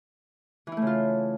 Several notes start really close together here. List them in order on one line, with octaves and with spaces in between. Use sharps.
E3 E4 A3 C#3 F4